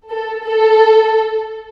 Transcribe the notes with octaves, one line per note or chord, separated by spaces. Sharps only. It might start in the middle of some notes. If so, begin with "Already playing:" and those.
A4
A4